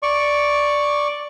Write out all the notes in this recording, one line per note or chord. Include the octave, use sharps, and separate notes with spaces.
D5 C#6